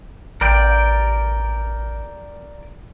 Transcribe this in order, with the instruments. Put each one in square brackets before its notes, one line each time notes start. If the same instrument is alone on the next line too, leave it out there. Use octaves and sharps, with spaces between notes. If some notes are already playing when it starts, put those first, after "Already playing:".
[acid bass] A1 [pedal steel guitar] A#4 D5 G5